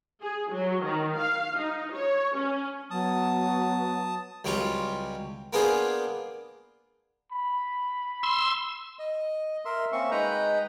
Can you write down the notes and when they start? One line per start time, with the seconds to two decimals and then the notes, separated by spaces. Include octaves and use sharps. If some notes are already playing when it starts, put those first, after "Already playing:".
0.22 G#4
0.51 F#3
0.83 D#3
1.18 F5
1.57 D#4
1.95 C#5
2.36 C#4
2.90 F#3 B3 A5 D#6
4.45 C#2 F#3 G3 C4 F4
5.53 A#3 B3 D4 F4 G#4 C5
7.32 B5
8.23 C6 E6
8.99 D#5
9.65 A#4 E5 C6
9.92 A#3 C4 C#4 E5 C#6
10.11 G#3 D#4 B4 D#5 G5 A#5